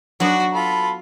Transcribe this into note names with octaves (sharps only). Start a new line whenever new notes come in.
F#3 B3 D4 F#4
F4 A4 B5